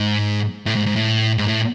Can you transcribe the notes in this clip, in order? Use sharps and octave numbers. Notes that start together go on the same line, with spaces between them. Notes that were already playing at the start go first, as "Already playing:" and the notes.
Already playing: G#2
A2
G#2
G#2
A2
G#2
A2